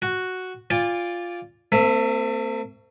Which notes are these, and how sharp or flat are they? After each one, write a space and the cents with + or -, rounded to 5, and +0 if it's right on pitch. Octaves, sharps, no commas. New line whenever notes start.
F#4 +0 F#5 +0
F4 +0 D5 -5 G#5 -40
A3 +40 C4 -25 E5 +0